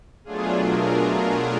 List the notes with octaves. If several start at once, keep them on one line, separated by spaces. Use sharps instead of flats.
B2 F#3 A3 D4 F4 G#4
A#4